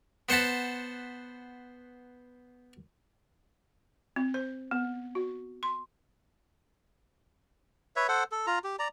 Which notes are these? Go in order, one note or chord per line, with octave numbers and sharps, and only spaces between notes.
B3 C5 F#5 A5 B5
C4
C5
B3
F#4
C6
B4 C#5 E5
A4 C5 F#5
A4
F4 A#5
G4
D5 A#5